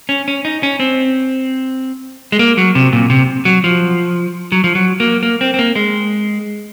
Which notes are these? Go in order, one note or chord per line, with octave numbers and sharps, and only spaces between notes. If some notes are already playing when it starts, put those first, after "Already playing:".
C#4
C#4
D#4
C#4
C4
G#3
A#3
F#3
C3
A#2
C3
F#3
F3
F#3
F3
F#3
A#3
A#3
C4
C4
A#3
G#3